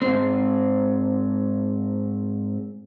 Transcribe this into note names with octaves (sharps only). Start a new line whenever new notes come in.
G#2 C4